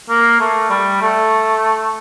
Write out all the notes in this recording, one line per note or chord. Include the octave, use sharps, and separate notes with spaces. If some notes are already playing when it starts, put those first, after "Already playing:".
A#3
A3
G3
A3